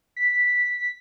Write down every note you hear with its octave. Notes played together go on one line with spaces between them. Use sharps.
B6